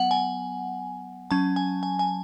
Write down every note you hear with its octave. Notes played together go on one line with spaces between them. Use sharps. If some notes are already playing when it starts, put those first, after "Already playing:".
Already playing: F#3 B3 F#5
G#5
F#3 C#4 A5
G#5
G#5
G#5